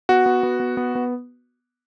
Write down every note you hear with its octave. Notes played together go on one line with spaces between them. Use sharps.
B3 F#4
B3
B3
B3
B3
B3